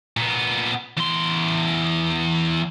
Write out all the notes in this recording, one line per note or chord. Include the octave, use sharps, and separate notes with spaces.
A#2 B3
E2 C6